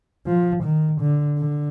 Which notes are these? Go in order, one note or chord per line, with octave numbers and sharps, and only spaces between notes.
F3
D#3
D3
D3